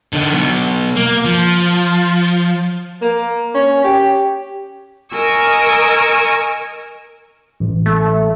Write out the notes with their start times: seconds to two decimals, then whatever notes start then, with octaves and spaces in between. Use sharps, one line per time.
0.13 D3 D#4
0.32 B2 F#3
0.96 A#3
1.25 F3
3.02 A#3
3.54 C#4
3.84 G4
5.13 A#4 D#5 G#5 C#6 E6
7.60 A1
7.86 A3